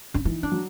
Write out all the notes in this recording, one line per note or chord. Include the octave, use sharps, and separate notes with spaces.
D4
E3 D#4
D4
F#3